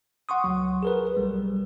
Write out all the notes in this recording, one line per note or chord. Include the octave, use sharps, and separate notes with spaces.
F#5 C6 C#6 D#6
C#2 F#3
G#4 A#4 B4
B1 G3